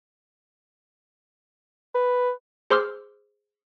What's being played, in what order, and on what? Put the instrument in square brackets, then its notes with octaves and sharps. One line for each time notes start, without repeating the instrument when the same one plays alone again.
[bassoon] B4
[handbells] G#4 C5 C6 D6 E6 F6